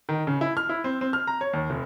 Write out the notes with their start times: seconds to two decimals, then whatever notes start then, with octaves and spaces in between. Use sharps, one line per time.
0.09 D#3
0.27 C#3
0.41 E4
0.57 F6
0.69 E4
0.84 C4
1.01 C4
1.13 F6
1.27 A#5
1.41 C#5
1.53 D#2
1.70 F1